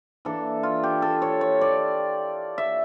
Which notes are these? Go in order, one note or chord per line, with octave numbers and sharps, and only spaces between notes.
E3 A#3 D4 A4
F4
G4
A4
C#5
C#5
D5
E5